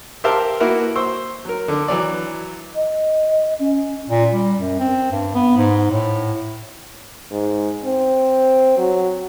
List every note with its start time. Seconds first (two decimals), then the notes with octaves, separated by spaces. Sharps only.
0.24 G4 A#4 C5 E5 F5 A5
0.60 A#3 E4 F#4 A#4 B4
0.96 C5 C#6 E6
1.45 F#3 A#4
1.68 D3
1.88 E3 F#3 D5
2.74 D#5
3.59 C#4
4.10 A#2
4.33 G3
4.58 F#2
4.80 C4
5.12 G2
5.35 B3
5.57 G#2
5.91 A2
7.31 G#2
7.84 C4
8.78 F#3